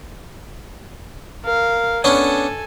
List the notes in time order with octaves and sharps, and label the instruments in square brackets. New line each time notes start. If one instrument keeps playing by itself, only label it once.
[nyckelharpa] A#4 F5
[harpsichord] B3 C#4 D4 [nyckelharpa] A4 G#5